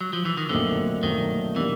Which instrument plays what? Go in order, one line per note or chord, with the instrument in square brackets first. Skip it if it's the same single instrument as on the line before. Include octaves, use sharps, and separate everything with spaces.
[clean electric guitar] F#3
F3
E3
D#3
[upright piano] B1 A#2 F#3 A3 C4 [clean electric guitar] D3
[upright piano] B1 A#2 F#3 A3 C4 [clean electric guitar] D#3
[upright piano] B2 G3 A#3 D4 [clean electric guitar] E3